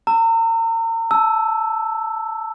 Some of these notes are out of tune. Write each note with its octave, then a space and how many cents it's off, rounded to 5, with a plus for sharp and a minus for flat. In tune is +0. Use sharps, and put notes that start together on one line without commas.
A#5 -40 E6 +10
A5 +0 E6 +0